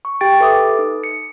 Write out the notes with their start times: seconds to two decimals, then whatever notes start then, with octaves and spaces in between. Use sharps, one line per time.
0.05 C#6
0.21 G4 G5 A6 D7
0.40 A4 B4 E5 D6 D#6
0.79 D#4
1.04 C#7